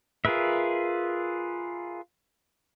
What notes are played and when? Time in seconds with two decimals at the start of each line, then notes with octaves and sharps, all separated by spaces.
0.25 F4 G#4 A#4 B4 E5